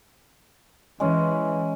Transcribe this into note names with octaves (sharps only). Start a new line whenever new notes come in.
E3 G#3 C#4